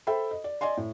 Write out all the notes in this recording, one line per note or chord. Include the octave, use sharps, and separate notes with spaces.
A4 C5 E5 G5 B5
D#5
D5
D5 D#5 G#5 C6
A2